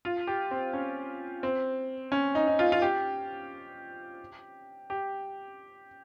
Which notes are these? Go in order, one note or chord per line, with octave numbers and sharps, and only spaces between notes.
F4
G4
C4
C#4
C4
C#4
D#4
D#4
F4
F4
G4
G4